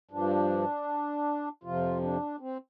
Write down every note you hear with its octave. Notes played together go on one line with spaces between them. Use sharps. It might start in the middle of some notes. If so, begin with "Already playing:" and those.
G2 F3 D4
F2 C3 F3 F4
D4
C4